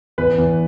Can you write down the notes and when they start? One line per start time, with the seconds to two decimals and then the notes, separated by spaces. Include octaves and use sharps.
0.18 E2 B4
0.38 E2